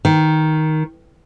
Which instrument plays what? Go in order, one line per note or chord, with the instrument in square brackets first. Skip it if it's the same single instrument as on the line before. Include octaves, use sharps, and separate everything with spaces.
[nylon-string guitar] D#3